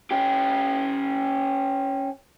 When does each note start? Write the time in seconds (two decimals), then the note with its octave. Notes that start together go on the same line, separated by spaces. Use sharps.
0.11 C#4 G4